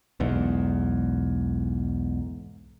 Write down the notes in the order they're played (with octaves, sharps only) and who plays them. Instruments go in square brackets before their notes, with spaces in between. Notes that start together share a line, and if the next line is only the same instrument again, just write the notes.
[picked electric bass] B1 E2 G#2